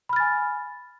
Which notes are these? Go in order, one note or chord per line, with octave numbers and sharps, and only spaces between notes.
G#5 B5 F6 A6